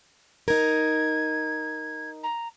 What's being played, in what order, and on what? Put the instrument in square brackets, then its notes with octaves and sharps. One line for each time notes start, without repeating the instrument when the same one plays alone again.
[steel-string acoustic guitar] D#4 A#4 [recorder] G#6
[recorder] A#5